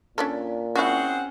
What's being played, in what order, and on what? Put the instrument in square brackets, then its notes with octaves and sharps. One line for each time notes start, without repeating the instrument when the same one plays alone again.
[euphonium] A#2 [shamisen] C#4 D4 A4
[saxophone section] C4 G#4 F#5 [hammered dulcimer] C#4 [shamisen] E4 F#4